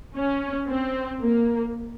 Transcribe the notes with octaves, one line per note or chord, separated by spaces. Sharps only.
C#4
C4
A#3